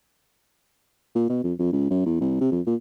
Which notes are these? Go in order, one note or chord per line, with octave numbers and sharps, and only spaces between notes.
A#2
B2
F2
F2
C#2
F#2
E2
C2
C3
F2
A#2